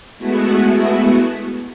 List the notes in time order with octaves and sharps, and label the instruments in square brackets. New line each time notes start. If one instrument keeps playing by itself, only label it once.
[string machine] G#3 A3 B3 E4 F#4